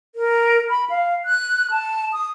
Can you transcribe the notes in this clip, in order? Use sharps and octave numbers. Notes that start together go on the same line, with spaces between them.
A#4
B5
F5
F#6
A5
D#6